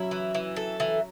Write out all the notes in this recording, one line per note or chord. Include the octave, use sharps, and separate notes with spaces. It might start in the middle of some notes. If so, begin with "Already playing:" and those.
Already playing: F#3 C#4 E4
E3
E3
A4
E3